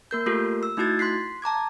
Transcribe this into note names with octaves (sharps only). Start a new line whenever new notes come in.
A#3 A#4 G6
A3 A#3 F4 G4 A4 A#4
E6
A3 D#4 E4 F#4 G#6 A6
C6 F#6 B6 C7
A5 A#5 D6 G#6